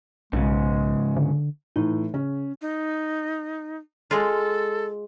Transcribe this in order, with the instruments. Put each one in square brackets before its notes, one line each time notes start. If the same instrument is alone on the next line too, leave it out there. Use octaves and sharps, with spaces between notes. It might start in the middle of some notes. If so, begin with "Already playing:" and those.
[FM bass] B1 [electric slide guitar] G#2 C#3 [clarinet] G#3
[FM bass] D3
[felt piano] A2 E3 [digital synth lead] D#4
[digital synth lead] C#3 [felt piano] C#4
[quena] D#4
[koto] G#3 F4 [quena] A4